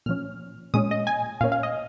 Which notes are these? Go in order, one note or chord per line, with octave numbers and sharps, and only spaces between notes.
A#2 F3 C#4 F6
A#2 G#3 C#4 D#6
D#5
G#5
A#2 A#3 C#4 F5
F5
D#5